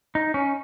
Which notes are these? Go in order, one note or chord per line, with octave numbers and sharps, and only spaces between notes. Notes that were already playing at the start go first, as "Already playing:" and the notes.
D#4
C#4